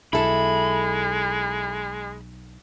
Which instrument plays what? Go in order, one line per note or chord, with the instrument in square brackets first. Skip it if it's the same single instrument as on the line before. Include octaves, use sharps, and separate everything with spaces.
[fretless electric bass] B1 [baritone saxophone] G#3 [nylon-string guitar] E4 A4 [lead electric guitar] B5